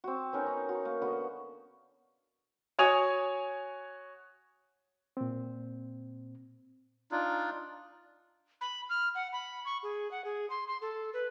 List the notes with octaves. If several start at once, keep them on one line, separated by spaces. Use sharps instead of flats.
C4 F#4
B3 C#4 D#4 A#4
D#4
F#4
A#3
D3 B3 F#4
F#4 C#5 G#5 D#6 F7
A#2 C4
D4 D#4 F4
B5
F6
F#5
B5
C#6
G#4
F#5
G#4
C6
C6
A4
B4